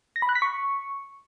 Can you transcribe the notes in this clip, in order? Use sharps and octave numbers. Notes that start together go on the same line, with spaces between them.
A#6
B5
F#6
B6
C#6